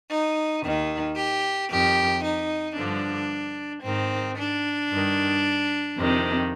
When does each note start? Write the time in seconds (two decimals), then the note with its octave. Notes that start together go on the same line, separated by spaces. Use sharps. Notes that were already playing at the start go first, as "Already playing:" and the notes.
0.10 D#4
0.63 D#2 D#3
1.16 G4
1.69 F2 D#3 G4
2.23 D#4
2.76 G2 D3 F3 D4
3.83 G#2 D#3 C4
4.37 D4
4.89 G2 D#3
5.97 F2 C3 D#3